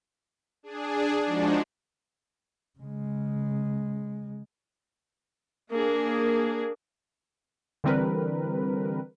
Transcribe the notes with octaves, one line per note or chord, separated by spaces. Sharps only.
D4 G#4
F3 G#3 D4 D#4 F#4
C#3 G#3
A#3 D4 G#4
D3 E3 G3 C4 A#4 B4